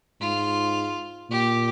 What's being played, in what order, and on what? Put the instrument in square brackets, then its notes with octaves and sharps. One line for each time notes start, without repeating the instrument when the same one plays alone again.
[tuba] G#2 [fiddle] F4
[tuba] A#2 [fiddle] G4